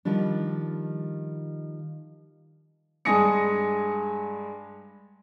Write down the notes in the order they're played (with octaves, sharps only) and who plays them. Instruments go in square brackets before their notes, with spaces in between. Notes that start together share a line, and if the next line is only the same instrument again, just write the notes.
[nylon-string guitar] D#3 F3 G3 D4
[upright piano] G2 G#3 G#5 D#6 A#6 C#7